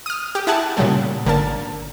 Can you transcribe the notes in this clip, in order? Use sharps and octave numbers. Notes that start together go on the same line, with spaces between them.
D#6 F6
G4
E4 G#4 F#5 G#5 A5
A#2 C#3 F#3 G3 A3
G#1 D3 A#3 A#4 A5